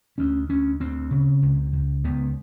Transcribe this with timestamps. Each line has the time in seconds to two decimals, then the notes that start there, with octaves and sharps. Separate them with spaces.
0.18 D2 C#4
0.49 D2 C#4
0.80 D2 C4
1.11 C#3
1.42 C#2
1.73 C#2
2.04 C#2 B3